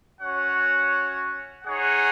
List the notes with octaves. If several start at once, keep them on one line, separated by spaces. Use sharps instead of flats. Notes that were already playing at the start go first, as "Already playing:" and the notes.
C#4 F#4 C#5 F#5
D#4 G#4 C#5 F#5